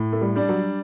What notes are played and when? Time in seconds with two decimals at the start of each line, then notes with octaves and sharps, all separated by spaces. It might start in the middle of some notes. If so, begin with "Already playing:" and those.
Already playing: A2
0.13 A3
0.21 G3
0.36 G3 D4
0.49 F#3